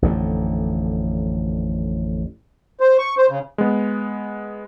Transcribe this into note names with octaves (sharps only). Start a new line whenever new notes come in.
A1 F2 D3
C5
C#6
C5
C#3
G#3 B3